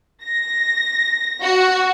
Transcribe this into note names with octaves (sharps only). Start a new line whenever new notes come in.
A#6
F#4